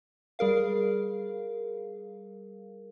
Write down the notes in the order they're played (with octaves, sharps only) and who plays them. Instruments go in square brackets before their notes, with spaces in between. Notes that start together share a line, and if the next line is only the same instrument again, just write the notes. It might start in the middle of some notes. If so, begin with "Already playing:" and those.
[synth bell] G3 G#4 A#4 F5